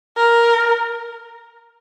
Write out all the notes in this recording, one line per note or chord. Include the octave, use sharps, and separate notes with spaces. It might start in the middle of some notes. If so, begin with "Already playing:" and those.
A#4